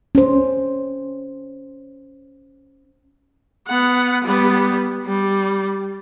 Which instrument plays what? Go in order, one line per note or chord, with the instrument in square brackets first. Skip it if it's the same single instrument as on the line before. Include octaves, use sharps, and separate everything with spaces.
[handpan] C#4 C5
[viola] B3 F#5
G3 B3
G3